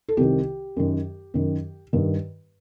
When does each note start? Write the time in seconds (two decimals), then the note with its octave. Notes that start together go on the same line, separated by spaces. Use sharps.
0.09 A4
0.17 C2 C3 D#3 G4
0.76 F#2 D#3
1.34 F#2 D#3
1.93 G2 D#3